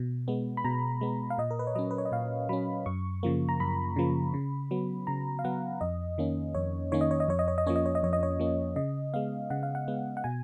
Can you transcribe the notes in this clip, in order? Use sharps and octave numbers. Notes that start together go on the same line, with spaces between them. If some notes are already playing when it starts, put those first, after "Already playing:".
Already playing: B2
G#3 B3
B5
B2 A#5
G#3 B3
F5
A#2 D#5
A#4
B4
C#5
F#3 C#4 D#5
B4
C#5
D#5
A#2 F5
F#3 C#4 B5
F#2 C#6
C#3 F3 A#3
A#5
F#2 B5
C#3 F3 A#3
C#3
F#3 B3
C#3 A#5
F5
F#3 B3 F#5
F2 D#5
D#3 A#3 C#4
F2 C#5
D#3 A#3 C#4 C#5
D#5
C#5
D#5
F2 C#5
D#5
C#5
D#5
F3 A#3 C#4 C#5
D#5
C#5
D#5
F2 C#5
D#5
C#5
F3 A#3 C#4
C#3 D#5
G#3 B3 F5
C#3 F#5
F5
F#5
G#3 B3
F#5
B2 G#5